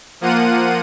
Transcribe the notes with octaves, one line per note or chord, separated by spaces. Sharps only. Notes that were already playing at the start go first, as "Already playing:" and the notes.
F3 A#3 F4 F#5 D#7